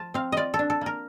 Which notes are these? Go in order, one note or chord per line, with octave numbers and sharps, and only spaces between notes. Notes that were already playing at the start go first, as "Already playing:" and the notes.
Already playing: F3 F4 A5
C4 F5
F4 D5 D#5
A4
D4
A4
A#3 A#4